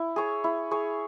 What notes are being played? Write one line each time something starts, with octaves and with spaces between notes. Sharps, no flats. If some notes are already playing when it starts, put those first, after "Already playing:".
Already playing: E4
G#4 C#5
E4
G#4 C#5